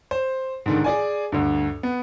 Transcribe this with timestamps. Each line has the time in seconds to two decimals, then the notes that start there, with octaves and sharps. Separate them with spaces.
0.11 C5
0.66 G#2 D3 D#3
0.84 G#4 D5 G#5
1.32 D2 G2
1.83 B3